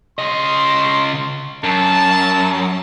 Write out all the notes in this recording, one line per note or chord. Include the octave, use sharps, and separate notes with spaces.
C#3 D#5 C6
F#2 A5